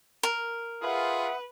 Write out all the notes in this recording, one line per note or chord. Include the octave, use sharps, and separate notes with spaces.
A#4
F4 G#4 B4 E5 F#5 D#6